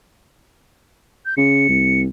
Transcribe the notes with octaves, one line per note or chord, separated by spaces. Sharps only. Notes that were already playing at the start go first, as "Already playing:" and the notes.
G6
C#3 C#7
C2